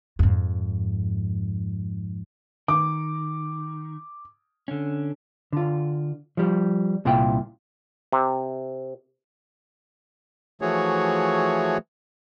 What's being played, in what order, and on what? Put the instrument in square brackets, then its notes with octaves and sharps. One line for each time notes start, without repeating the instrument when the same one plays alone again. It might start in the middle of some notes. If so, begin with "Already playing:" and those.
[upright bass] F2 G#2
[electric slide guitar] D#3 [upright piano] D6
[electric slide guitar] D3 C#4
[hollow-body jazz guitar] D3 F4
F3 G3
C2 A#2 E4 F4 G5
[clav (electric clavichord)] C3
[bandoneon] E3 F3 A3 F#4 G#4 C#5